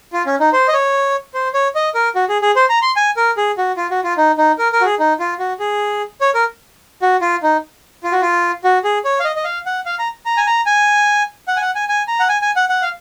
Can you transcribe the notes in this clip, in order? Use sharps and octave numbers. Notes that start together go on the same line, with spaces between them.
F4
C#4
D#4
C5
D#5
C#5
C5
C#5
D#5
A#4
F#4
G#4
G#4
C5
A#5
C6
G#5
A#4
G#4
F#4
F4
F#4
F4
D#4
D#4
A#4
A#4
F#4
G#4
D#4
F4
F#4
G#4
C#5
A#4
F#4
F4
D#4
F4
F#4
F4
F#4
G#4
C#5
F5
D#5
D#5
F5
F#5
F5
A#5
A#5
G#5
A#5
G#5
F#5
G#5
F#5
G#5
G#5
A#5
F#5
G#5
G#5
F#5
F#5
F5